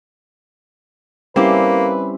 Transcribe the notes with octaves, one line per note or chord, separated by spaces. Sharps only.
G3 A#3 C4 C#4 E4 G4 B4